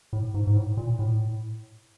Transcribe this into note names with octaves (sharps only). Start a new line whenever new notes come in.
A2
G#2
G#2
A2
A#2
A2